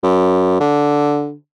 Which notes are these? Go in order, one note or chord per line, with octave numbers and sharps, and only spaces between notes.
F#2
D3